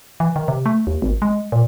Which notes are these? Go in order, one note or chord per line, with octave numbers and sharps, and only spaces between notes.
E3
D#3
C3
A3
D#2
G#1
G#3
A#2